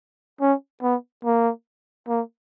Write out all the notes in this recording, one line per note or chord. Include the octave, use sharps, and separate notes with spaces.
C#4
B3
A#3
A#3